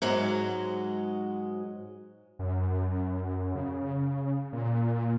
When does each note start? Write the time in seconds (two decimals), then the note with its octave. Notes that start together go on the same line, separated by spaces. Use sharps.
0.02 G#2 F#3 G#3
2.39 F#2
3.55 C#3
4.53 A#2